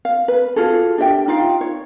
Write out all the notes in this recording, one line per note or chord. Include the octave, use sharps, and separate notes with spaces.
F5
B4
F4 F#4 G#4 A4
D4 G4 E5 G5
D#4 F4 F5 G5
C#5